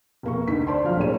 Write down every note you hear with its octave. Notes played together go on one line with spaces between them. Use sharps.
F1 A#3 C#6
D2 D3 D#4 B6
C5 D5 A5 C6
D2 F3 F#3 F5 F6
D2 A2 A#3 C#5 D#7